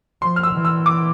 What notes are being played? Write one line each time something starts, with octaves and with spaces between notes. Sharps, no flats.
F3 C6
F6
E6
E3
E6
D6